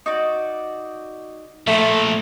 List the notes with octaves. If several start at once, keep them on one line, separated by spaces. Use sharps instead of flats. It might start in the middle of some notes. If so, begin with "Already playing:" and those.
D#4 F#4 D5
A#2 F3 A3 E5 B5 C#6